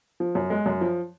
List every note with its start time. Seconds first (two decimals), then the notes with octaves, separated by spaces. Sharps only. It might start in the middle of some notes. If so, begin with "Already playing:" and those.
0.20 F3
0.35 F#2
0.50 G#3
0.66 F#2
0.81 F3